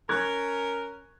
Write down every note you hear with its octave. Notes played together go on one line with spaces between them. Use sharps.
C#4 A#4 C#6 F#6 G#6